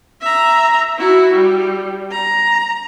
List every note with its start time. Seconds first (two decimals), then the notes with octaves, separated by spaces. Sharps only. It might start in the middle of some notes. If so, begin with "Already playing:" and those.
0.21 E5 A#5
0.98 E4 F#4
1.34 G3
2.11 A#5